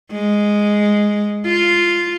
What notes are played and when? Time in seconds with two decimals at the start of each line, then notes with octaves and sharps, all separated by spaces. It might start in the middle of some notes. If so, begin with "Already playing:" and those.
0.12 G#3
1.46 F4